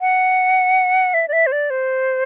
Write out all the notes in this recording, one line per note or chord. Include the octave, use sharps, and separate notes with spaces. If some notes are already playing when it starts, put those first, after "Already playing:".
F#5
E5
D5
E5
C5
D5
C5